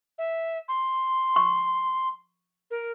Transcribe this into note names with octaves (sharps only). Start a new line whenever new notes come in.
E5
C6
C#6
A#4